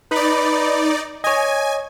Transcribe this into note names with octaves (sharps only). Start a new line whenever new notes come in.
D#4 B4 D5 B5
C#5 D#5 G#5